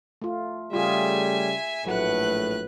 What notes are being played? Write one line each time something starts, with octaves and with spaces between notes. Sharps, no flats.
A3 F4
C#3 G3 A3 F4 G#4 E5 G#5
A#1 A2 F#3 A3 B4 F#5 F#6